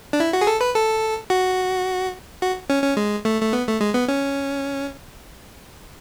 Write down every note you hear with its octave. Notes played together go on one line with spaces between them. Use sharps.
D4
E4
F#4
G#4
A4
B4
A4
F#4
F#4
C#4
C#4
G#3
A3
A3
B3
A3
G#3
B3
C#4